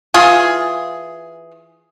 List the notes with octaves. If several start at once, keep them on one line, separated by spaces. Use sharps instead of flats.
E3 F4 G#4